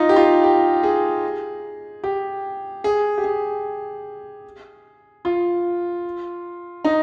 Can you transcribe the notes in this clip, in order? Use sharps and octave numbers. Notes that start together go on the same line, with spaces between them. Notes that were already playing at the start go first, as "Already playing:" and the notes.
Already playing: D#4 F4
G4
F4
G4
G#4
G4
G#4
G4
G#4
F4
D#4